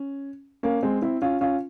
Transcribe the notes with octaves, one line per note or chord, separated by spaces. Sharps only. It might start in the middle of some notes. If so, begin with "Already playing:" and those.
Already playing: C#4
A#3 C#4
G#3 C4
C4 E4
C#4 F4
C#4 F4